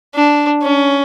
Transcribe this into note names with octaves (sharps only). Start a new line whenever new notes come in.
D4
C#4